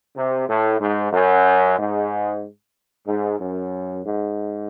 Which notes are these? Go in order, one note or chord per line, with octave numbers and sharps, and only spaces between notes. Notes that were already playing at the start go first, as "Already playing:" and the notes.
C3
A2
G#2
F#2
G#2
G#2
F#2
G#2